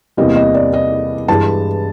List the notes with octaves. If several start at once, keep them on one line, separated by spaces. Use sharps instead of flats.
E2 C3 E3 G3 A#3 D#5
D#5
D5
D#5
G2 E3 G#3 A5